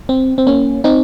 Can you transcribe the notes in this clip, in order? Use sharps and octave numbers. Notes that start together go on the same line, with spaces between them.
C4
C4
A#3 C#4
C4 D#4